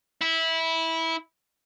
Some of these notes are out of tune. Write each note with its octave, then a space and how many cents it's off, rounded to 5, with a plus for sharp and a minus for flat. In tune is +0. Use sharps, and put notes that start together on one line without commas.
E4 -15